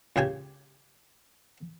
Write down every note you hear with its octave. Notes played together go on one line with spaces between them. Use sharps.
C#2 C#3 G4 G#5